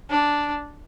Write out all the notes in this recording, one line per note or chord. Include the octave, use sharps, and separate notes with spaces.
D4